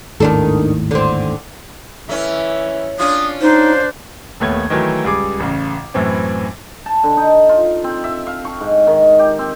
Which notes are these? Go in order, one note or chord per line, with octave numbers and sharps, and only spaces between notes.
G#1 D#2 A2 D#3 D4 A4
D3 C4
E3 A3 C#4
C#4 D4 F4 D#6
D4 D#4 C5
D#1 D#2 A3 B3 C#5 G#6
D#3 E3 F#3 A3
C#2 G3 G#4 D6
A1 C#3
F#2 A2 E3 C4
A5
D3
D#4
F4
C4
E5
F5
C#6
G#2
D#3
G4
C4